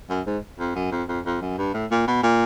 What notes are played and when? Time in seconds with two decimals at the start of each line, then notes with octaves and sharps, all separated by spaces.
0.10 F#2
0.26 G#2
0.59 F2
0.75 F#2
0.92 F2
1.08 F2
1.25 F2
1.42 F#2
1.58 G2
1.74 A2
1.91 A#2
2.08 B2
2.23 A#2